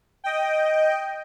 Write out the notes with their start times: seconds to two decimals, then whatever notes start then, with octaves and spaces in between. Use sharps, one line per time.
0.24 D#5 G5